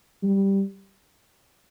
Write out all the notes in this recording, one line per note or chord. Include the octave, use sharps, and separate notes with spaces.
G3